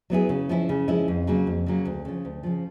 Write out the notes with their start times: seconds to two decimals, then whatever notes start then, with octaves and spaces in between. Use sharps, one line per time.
0.10 F#3 B3 E4 G#4
0.29 C#3
0.49 F3 G#3 C#4 E4
0.69 C#3
0.88 F3 G#3 C#4 E4
1.08 F2
1.27 C#3 F#3 A#3
1.47 F2
1.66 C#3 F#3 A#3
1.85 D2
2.05 C#3 F3
2.25 D2
2.43 C#3 F3